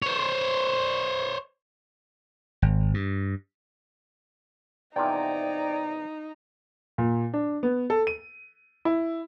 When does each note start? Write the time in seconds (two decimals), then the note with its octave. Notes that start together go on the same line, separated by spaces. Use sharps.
0.02 C5 C#5
2.62 G#1
2.94 G2
4.96 E2 C3 F3 D#4 D5 G5 A#5
6.98 A#2
7.34 D4
7.63 B3
7.90 A4
8.07 D#7
8.85 E4